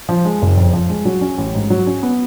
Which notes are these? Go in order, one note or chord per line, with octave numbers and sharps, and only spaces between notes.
F3
G#3
F#1
F2
F3
G#3
F#3
C#4
A1
G#2
F#3
C#4
B3